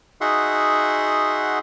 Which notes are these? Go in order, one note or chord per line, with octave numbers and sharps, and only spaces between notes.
D#4 F#4 G#4 E5 F#5 C6